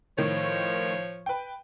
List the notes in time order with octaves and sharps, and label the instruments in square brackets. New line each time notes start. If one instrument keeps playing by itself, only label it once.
[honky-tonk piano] A2 D#3 [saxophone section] F3 C#5
[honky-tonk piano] B4 G5